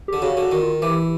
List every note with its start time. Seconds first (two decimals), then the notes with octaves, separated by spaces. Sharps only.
0.08 D3 G4
0.22 C#3 F#4
0.37 D3 F#4
0.52 D#3 F#4
0.62 F4
0.82 E3 G4